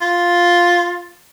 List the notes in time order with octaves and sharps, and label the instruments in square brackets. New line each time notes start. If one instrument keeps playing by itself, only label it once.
[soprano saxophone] F4